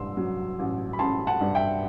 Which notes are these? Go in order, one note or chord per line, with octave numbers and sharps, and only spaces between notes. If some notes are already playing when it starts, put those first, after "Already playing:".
Already playing: A1 G2 C6 E6
F#3
A1
B5
A1 A5 C6
F#5 A5
G2
E5 G5